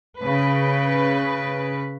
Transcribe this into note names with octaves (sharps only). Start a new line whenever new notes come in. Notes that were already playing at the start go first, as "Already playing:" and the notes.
C#3 B4